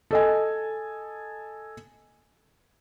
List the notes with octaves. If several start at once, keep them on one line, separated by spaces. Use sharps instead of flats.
A4 D#5 G#5